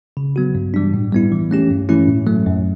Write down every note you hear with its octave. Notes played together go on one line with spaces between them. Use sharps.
C#3
F#3 B3 F#4
G2
E3 G3 D4
A2
G3 B3 E4
E3
A3 C#4 G4
G2
E3 A3 C#4 E4
A2
F#3 A3
F#2